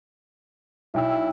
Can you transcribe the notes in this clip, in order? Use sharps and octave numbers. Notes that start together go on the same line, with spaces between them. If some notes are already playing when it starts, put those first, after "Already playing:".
B1 E4 G5 E6